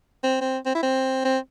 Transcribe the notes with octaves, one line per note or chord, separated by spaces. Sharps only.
C4
C4
C4
E4
C4
C4